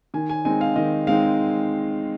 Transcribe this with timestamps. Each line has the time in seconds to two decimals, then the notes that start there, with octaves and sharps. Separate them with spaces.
0.14 D#3 G#5
0.29 G#5
0.45 G#3 C4 D#4 G#5
0.61 F5
0.76 D#3 D#5
1.07 G#3 C4 D#4 F5